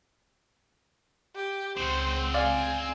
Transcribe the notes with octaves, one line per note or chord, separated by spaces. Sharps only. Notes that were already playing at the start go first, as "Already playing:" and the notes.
G4
C#2 C4 C5 F#5
D5 F5 G#5